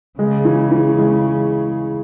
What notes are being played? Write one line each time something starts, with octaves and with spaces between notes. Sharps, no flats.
C#3 G#3
E3
E3
G#3